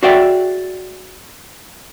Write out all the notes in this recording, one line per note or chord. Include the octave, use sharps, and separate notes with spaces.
F#4 G#4 C#5 D5 E5 G5